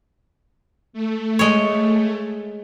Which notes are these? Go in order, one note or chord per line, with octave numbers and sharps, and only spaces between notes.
A3
G#3 C#5